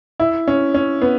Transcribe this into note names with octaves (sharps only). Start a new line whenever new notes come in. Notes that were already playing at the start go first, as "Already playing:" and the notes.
E4
C#4
C#4
B3